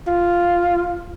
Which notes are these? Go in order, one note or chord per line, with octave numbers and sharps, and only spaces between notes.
F4